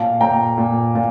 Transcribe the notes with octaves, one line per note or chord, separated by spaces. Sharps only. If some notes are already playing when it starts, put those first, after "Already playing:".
Already playing: A#2 F5 A5
A#2 G5 A#5
A#2
A#2